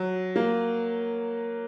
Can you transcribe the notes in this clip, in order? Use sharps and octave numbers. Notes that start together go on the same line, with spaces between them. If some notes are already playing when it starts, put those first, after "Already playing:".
Already playing: F#3
A#3